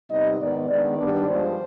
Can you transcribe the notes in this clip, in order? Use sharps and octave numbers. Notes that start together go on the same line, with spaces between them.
C3 G3 B3 D#4 D#5
G#2 D#3 B3 D#4 D5
D#3 G#3 B3 D4 D5
D#3 G3 B3 D4
G2 F3 G#3 C5